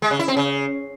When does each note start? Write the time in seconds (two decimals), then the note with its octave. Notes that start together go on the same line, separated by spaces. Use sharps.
0.02 G#3
0.11 C#3
0.19 E4
0.28 C4
0.37 C#3